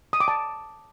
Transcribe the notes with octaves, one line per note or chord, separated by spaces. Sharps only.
D#6
D6
A5